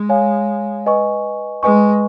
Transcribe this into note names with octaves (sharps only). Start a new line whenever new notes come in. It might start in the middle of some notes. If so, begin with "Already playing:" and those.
Already playing: G#3
C#5 F5 G#5
B4 D#5 G#5 C#6
G#3 B4 D#5 G#5 C#6